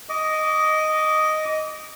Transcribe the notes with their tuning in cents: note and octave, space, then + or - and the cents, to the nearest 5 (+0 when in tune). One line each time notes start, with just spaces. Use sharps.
D#5 +0 D6 -30